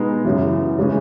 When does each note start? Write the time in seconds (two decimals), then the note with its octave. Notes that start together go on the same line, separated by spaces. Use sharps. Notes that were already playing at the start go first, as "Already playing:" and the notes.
Already playing: B2 G#3 B3 D#4
0.25 F#2 C#3 E3
0.78 C#3 E3 G#3 C#4